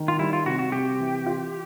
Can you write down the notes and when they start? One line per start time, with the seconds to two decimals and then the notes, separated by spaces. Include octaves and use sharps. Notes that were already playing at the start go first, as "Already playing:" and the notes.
Already playing: D#3
0.08 F4
0.19 G3 E4
0.33 F4
0.46 C3 F#4
0.59 F#4
0.72 C3 G4
1.00 E3
1.26 F4